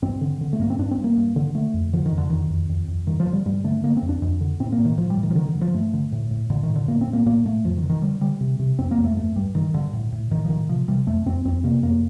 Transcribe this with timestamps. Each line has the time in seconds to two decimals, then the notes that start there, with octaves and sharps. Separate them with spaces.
0.02 G2 C4
0.21 D3
0.41 D3
0.53 A3
0.59 G2 A#3
0.70 C4
0.79 G2 D4
0.91 C4
0.98 G2
1.04 A#3
1.17 G2
1.36 D3
1.54 D3 A3
1.74 F2
1.93 D3 F3
2.06 D#3
2.12 F2
2.18 D3
2.30 F2 D#3
2.50 F2
2.69 F2
2.88 F2
3.07 G2 D#3
3.20 F3
3.27 D3
3.33 G3
3.45 G2 G3
3.64 D3 A3
3.83 D3 A#3
3.97 C4
4.02 F2
4.09 D4
4.22 F2
4.41 D3
4.60 A2 C4
4.72 A#3
4.79 A2
4.85 D#3
4.97 A2 F3
5.10 G3
5.17 A2
5.23 D#3
5.31 F3
5.35 D3 D#3
5.49 D3
5.54 G2
5.61 F3
5.74 G2 A3
5.93 D3
6.12 A2
6.31 A2
6.50 A2 D3
6.63 D#3
6.69 A2
6.76 D3
6.88 A2 A#3
7.01 C4
7.07 A2
7.13 A#3
7.26 A2 A#3
7.45 A2 A3
7.64 F2 F3
7.77 D#3
7.83 D3
7.90 D#3
8.02 D3 G3
8.21 D3 G3
8.41 C3
8.59 C3
8.79 F2 C4
8.91 A#3
8.97 F2
9.04 A3
9.17 G2 A3
9.36 G2 G3
9.55 G2 D#3
9.74 G2 D3
9.93 A2
10.12 A2
10.31 A2 D#3
10.45 F3
10.50 A2 D#3
10.69 C3 F3
10.88 C3 G3
11.07 F2 A3
11.26 F2 C4
11.45 F2 C4
11.64 C3 A#3
11.83 F2 A#3